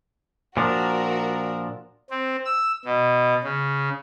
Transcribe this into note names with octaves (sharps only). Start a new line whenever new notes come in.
A#2 F3 D4 F#4 A#4
C4
E6
B2
C#3